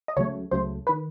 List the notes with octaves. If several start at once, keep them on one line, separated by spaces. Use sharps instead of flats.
D#5
C#2 C#3 F#3 A3 C#5
C#2 C#3 F#3 A3 C5
D#3 B4